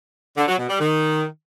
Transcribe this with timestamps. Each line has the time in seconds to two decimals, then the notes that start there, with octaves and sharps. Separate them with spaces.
0.37 D3
0.47 F#3
0.58 B2
0.69 G3
0.80 D#3